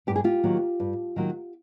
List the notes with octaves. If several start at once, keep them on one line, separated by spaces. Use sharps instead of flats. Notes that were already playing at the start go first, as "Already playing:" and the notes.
G2 G4
G#4
F4 G4
D#3 F#3 A#3
G2
D#3 F#3 A#3